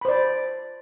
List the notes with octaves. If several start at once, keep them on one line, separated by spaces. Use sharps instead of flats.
C5 D5 B5